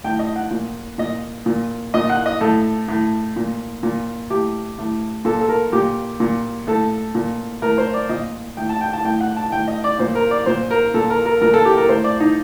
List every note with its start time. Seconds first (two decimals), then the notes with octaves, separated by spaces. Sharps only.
0.04 A2 G5
0.19 D#5
0.36 F#5
0.51 A#2
0.98 A#2 D#5
1.46 A#2
1.94 A#2 D#5
2.10 F#5
2.26 D#5
2.41 A2 A4
2.88 A2
3.36 A#2
3.83 A#2
4.30 A2 G4
4.78 A2
5.25 A#2 A4
5.41 A4
5.49 A#4
5.72 A#2 G4
6.20 A#2
6.67 A2 A4
7.15 A#2
7.62 A2 A#4
7.78 C5
7.94 D5
8.09 A#2 D#5
8.57 A2 G5
8.69 A5
8.81 G5
8.93 A5
9.05 A2 G5
9.21 F#5
9.36 A5
9.52 A2 G5
9.68 D#5
9.84 D5
9.99 A#2 C5
10.15 A#4
10.31 D5
10.46 A#2 C5
10.71 A#4
10.94 A#2 A4
11.10 A#4
11.26 A#4
11.42 A#2 A#4
11.54 A4
11.65 G4
11.77 A#4
11.89 A2 C5
12.04 D5
12.20 D#4